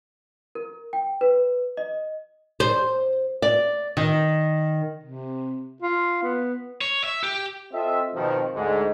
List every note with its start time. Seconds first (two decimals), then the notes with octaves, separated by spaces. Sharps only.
0.55 A#4
0.93 G5
1.21 B4
1.77 D#5
2.60 C5
3.42 D5
3.97 D#3
5.04 C3
5.82 F4
6.23 B3
6.81 C#5
7.04 E5
7.23 G4
7.72 C4 F4 A4 D#5 E5
8.14 F2 B2 D#3 F3
8.54 D2 G#2